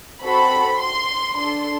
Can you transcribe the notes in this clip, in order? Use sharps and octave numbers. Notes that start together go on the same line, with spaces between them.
C4 F#4 A4 B5
C6
D4 A4 C6